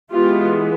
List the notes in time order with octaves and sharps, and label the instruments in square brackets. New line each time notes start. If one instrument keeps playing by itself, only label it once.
[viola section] E3 G#3 B3 F4 G4